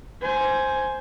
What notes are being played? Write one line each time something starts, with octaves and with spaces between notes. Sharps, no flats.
C5 G#5